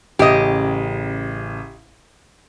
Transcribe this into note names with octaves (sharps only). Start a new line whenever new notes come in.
A1 C#3 G4 D#5